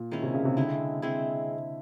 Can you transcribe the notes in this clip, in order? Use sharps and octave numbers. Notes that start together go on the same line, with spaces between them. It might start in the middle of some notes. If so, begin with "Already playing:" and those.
Already playing: A#2
D#3 G#3 C#4 E4
C3
C#3
C3
D3 G#3 C4 E4
G#3 C4 E4